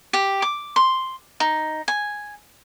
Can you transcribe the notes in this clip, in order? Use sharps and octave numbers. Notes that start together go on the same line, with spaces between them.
G4
D6
C6
D#4
G#5